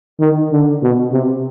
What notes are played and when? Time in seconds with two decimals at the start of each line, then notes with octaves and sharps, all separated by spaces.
0.20 D#3
0.52 D3
0.83 B2
1.13 C3